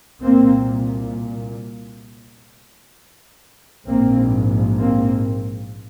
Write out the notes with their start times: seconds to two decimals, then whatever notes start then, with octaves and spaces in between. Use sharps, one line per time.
0.21 C2 A#2 A#3 C4
3.87 A#1 G#2 A#3 C4
4.79 A#3 C4